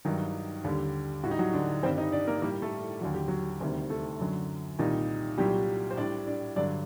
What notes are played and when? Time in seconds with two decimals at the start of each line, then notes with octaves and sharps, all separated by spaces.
0.05 G2 D#3 F#3 D#4
0.64 D#2 D3 G3
1.24 A2 G3 F#4
1.31 D#4
1.39 F#3 F#4
1.53 D3 D4
1.83 G2 D#3 G3 C4 C5
1.98 D#4 D#5
2.12 D4 D5
2.27 A#3 A#4
2.42 A2 G3 A#3 A#4
2.62 A3 A4
3.01 D#2 D3 F#3 F#4
3.14 G4
3.28 F#3 F#4
3.60 D2 C3 D#3 G3
3.90 A3 A4
4.20 F#2 D3 F#3
4.79 C2 A#2 D#3 G3 D#4
5.38 C2 A#2 F#3 G3 G4
5.91 C5
5.97 A2 D4 D5
6.02 G3
6.26 D4 D5
6.56 G2 D3 F#3 D4 D5